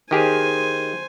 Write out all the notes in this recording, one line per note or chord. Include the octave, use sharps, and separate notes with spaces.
D#3 G4 G#4 C5 G#5